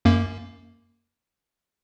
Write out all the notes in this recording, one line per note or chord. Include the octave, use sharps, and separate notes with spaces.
F#2 A#3